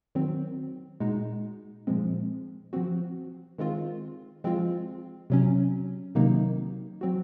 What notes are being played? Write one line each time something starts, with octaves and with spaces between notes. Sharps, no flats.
D#3 F#3 C4
A#2 G#3 D#4 F#4
A#2 F3 G#3 C4
F3 C4 F#4
D#3 G#3 C4 F4
F3 G#3 C4 F4
C3 F#3 C#4
C3 D#3 F#3 A#3 D#4
F#3 C4 F#4